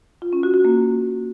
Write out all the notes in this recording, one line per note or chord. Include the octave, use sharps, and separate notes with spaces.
F4
C#4
F#4
F#4
A#3